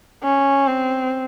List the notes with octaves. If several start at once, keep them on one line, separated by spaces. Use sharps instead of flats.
C#4
C4